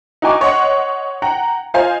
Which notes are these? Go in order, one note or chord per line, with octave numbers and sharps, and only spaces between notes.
D#4 F#4 G5 G#5 C#6 D6
C#5 D#5 F#5 C6
F#5 G5 A#5
F4 C5 D#5 F5 G#5